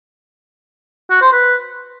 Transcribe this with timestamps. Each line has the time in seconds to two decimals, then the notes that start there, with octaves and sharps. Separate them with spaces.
1.10 F#4
1.22 C5
1.33 B4